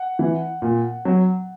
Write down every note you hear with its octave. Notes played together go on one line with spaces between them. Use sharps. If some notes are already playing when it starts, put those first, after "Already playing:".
Already playing: F#5
E3
A#2
F#3